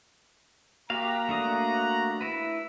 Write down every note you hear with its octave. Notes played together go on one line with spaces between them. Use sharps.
A#3 F#4 G4 F5 A#5
A3 D4 D#6
E4 B4